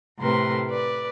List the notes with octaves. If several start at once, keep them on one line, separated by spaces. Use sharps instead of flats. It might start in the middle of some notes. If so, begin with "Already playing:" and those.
A2 C3 A3 A#4 B4 C6
B4 D5